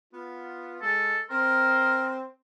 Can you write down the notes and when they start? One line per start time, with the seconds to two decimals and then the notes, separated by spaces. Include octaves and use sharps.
0.13 B3 F4
0.82 G#3 A4
1.30 C4 A#4 C6